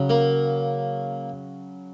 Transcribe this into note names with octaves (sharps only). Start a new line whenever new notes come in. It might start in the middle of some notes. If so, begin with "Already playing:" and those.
Already playing: C#3 F#3
A#3 A#4